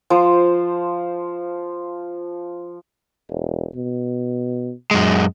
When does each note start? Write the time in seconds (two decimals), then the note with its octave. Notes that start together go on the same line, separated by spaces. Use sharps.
0.10 F3 C5
3.30 E1
3.75 B2
4.91 F#2 G#3